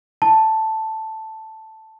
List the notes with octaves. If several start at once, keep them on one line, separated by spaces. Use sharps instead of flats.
A5